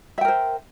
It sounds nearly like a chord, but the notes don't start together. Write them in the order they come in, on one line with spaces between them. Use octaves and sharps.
E5 G5 A#4 C5